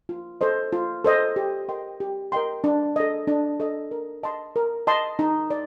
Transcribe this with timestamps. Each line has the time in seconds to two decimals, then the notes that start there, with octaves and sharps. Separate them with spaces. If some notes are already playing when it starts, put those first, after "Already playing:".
0.09 F4
0.41 A4 C5 D#5
0.72 F4
1.04 A4 C5 D#5
1.36 G4
1.68 A#4 D#5 G5 C6
2.00 G4
2.32 A#4 D#5 G5 C6
2.64 D4
2.96 A4 D#5
3.28 D4
3.60 A4 D#5
3.91 A#4
4.23 D#5 A5 C6
4.56 A#4
4.87 D#5 A5 C6
5.19 D#4
5.51 D5